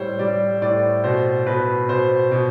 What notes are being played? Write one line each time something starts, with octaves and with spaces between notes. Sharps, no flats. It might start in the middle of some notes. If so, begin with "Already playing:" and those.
Already playing: A2 G3 C5 C#5
G3 D5
A2 D5
B2 C5
B2 B4
B2 C5
B2